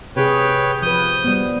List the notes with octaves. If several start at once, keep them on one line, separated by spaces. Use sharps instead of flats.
C3 G#4 B4 C#5 G5
F3 B4 D#6 G6
G3 B3